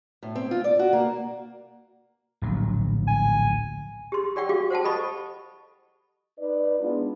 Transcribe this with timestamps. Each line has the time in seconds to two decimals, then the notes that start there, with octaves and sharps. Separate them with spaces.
0.23 A2
0.35 C4
0.51 F4
0.64 D5
0.79 F#4
0.93 A#3
2.42 D1 A#1 F#3
3.08 G#5
4.12 G4 C6
4.36 G4 D5 F#5 G5 C#6
4.49 F#4 G4 F5 D6
4.70 C5 F#5 G5 A5
4.84 A4 D#5 B5 C#6
6.39 D#4 B4 D5
6.80 G#3 B3 D4 E4 F4